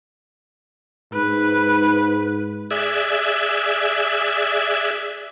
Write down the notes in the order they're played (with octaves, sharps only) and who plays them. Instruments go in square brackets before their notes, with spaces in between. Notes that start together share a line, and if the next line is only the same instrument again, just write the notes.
[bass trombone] G#2 [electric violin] B4
[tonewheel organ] G#4 D5 E5 E6 F#6 G#6